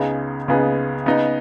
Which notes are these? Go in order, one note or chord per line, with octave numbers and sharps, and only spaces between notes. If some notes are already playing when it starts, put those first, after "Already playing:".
Already playing: C#2 C#3 B3 D#4 G#4
C#2 C#3 B3 D#4 G#4
C#3 B3 D#4